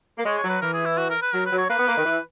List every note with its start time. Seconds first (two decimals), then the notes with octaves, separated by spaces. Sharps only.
0.18 A#3
0.25 G#3 C#5
0.38 C#5
0.44 F#3
0.49 B4
0.61 E3 A#4
0.74 G#4
0.86 E4
0.97 F#4
1.10 A#4
1.22 B4
1.33 F#3 A#4
1.46 B4
1.52 F#3
1.58 C#5
1.69 A#3 B4
1.79 B3
1.87 A#3
1.97 D#3
2.05 E3